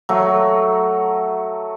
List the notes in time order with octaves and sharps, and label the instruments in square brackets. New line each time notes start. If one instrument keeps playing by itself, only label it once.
[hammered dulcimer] F#3 A3